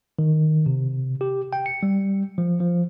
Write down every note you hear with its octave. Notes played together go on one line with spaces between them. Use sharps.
D#3
C3
G4
G5
C#7
G3
F3
F3